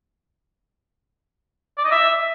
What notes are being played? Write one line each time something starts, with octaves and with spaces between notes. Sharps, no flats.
D5
D#5
E5